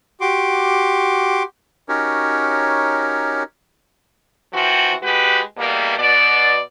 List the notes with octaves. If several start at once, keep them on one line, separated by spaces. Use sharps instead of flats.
F#4 G4 C6 D6
C#4 D#4 F#4 G4 A#4 C#5
E3 F3 C4 F#4
G#3 F#4 G4 B4
E2 B2 G3 A#3
B2 D5